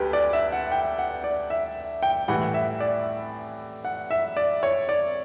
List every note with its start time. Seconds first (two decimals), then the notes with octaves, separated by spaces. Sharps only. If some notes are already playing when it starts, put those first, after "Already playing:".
Already playing: D2 G4 B4
0.13 D5
0.33 E5
0.52 F#5
0.72 G5
0.99 F#5
1.24 D5
1.50 E5
2.03 G5
2.28 A2 E3 G3 F#5
2.54 E5
2.81 D5
3.85 F#5
4.11 E5
4.37 D5
4.63 C#5
4.89 D5